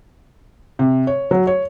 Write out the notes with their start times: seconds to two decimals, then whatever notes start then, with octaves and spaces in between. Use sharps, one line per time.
0.79 C3
1.07 C#5
1.31 F#3
1.47 C#5